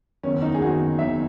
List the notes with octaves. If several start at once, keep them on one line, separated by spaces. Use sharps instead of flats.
F#1 E2 D#3 C#4
D#4
G#4
F#1 E2 D#3 F#4
F#1 E2 D#3 E5